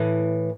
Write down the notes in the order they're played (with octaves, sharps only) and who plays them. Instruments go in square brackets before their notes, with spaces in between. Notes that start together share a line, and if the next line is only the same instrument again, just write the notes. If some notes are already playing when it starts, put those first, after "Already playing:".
Already playing: [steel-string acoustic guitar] A2 E3